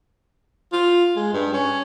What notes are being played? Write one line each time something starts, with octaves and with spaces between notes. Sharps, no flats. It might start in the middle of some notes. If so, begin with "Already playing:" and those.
F4
G#3
G2
C#4